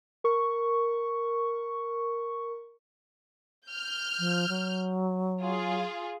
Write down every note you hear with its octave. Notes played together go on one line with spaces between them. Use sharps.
A#4 C#6
F6 G6
F3
F#3
F4 G#4